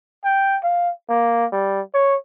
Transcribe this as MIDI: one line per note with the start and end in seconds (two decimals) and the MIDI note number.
0.24 0.58 79
0.63 0.91 77
1.09 1.46 58
1.52 1.81 55
1.94 2.16 73